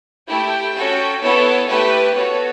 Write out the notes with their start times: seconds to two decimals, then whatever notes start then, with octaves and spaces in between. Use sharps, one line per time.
0.29 A3 E4 G4 G5
0.75 C#4 F#4 A4
1.22 B3 E4 A4 C#5
1.68 A3 E4 G4 B4
2.15 B3 F#4 A4 C#5